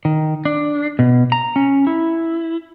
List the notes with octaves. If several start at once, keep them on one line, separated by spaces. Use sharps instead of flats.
D#3
D4
B2
A#5
C#4
E4